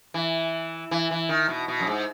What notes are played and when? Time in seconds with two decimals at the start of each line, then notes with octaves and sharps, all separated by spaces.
0.14 E3
0.91 E3
1.11 E3
1.29 D#3
1.49 B2
1.68 B2
1.80 F#2
1.87 G#2